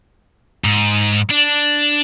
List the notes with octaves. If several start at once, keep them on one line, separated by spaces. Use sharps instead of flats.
G#2
D4